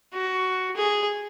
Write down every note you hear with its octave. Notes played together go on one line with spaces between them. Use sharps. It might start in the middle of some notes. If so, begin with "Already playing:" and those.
F#4
G#4